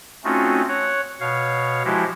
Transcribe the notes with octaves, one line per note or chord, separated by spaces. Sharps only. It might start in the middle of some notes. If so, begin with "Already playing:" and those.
A3 C4 C#4 D#4 F4 F#4
C#5 F#5
B2 C#5 F5
F3 G#3 E4 F#4 G4